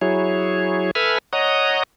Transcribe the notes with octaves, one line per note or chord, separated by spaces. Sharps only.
F#3 E4 G#4 C#5
A4 B4 E5 G#5 B5 F6
C#5 D#5 F#5 A#5 D#6